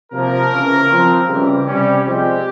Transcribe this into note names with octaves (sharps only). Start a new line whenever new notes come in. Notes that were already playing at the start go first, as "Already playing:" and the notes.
C3 F3 A#3 A#4
C#3 E3 A#3 C#4
F3 C4
C#3 E3 G3 C4 G4
C3 G3 C#4
C3 F3 G#3 C4 G4